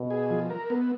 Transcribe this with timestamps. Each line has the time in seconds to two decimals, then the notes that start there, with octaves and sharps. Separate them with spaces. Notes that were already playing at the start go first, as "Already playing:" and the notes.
Already playing: B2
0.10 G#4
0.30 F3
0.50 A#4
0.70 B3